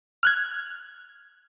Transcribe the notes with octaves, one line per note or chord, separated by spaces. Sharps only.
F6 F#6 G#6